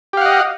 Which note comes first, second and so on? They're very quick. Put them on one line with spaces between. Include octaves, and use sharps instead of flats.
G4 F5 F#5 D#5